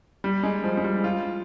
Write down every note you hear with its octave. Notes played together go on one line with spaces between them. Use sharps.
G3
G#3
F3
G#3
G3
F4